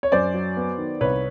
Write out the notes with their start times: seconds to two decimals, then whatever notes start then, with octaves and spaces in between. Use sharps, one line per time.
0.03 C#5
0.12 F#2 C5 D5
0.34 F#3
0.57 B3
0.78 D#3
1.01 C2 B4 C#5